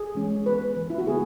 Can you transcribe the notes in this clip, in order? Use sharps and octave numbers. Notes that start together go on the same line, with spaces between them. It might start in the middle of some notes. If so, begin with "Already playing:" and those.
Already playing: G#4
E3 G#3 C#4
E3 B3 B4
E3 B3
E4
F#4
C#3 G#3 B3 G#4